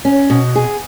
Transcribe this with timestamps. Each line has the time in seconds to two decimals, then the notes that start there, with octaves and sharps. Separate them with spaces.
0.05 C#4
0.30 B2
0.56 G#4